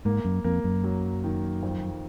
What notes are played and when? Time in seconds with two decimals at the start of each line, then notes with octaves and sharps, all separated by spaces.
0.05 G#2 A#3
0.25 F#2
0.44 F2 A#3
0.64 F#2
0.84 F#3
1.24 D#3
1.63 F2